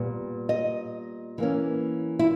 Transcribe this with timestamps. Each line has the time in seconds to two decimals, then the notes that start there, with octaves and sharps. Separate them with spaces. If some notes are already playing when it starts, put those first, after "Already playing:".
Already playing: A#2 G3 B3
0.49 D#5
1.38 E3 A#3 C#4
2.19 E4